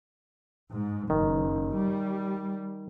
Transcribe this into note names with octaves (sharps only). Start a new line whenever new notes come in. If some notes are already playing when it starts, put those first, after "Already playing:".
G#2
F#1 D#3
G3